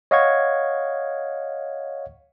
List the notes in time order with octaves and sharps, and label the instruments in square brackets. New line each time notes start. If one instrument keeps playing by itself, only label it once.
[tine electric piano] C#5 D#5 F5 F#5 C#6 G#6